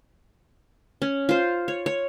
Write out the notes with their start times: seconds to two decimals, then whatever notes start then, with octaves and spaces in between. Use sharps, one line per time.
1.02 C#4
1.29 F4 C5
1.68 C#5
1.86 C#5